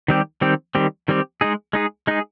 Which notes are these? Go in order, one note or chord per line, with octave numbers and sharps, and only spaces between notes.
D#3 G3 C4 G4
D#3 G3 C4 G4
D#3 G3 C4 G4
D#3 G3 C4 G4
G#3 D#4 G#4
G#3 D#4 G#4
G#3 D#4 G#4